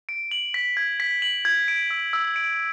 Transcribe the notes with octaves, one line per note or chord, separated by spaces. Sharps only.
D7
F#7
B6
G#6
B6
F#7
G#6
D7
E6
E6
D7